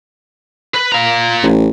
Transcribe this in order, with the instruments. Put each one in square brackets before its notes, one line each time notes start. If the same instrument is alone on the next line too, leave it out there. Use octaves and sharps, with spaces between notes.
[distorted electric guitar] B4
F4 A#5
[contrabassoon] A1